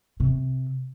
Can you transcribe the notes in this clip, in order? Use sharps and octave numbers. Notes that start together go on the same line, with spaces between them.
C3